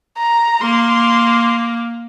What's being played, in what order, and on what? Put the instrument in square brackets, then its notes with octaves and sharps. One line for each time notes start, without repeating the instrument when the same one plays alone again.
[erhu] A#5
[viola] A#3 [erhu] C6